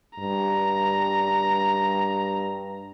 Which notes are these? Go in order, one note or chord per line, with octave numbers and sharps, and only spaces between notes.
G2 A#5